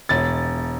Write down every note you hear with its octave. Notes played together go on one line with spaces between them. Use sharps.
E1 A6